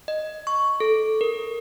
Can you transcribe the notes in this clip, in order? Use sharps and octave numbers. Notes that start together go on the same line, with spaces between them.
D#5
C#6
A4
A#4